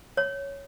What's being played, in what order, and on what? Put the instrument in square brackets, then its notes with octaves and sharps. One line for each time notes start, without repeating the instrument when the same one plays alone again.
[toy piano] C#5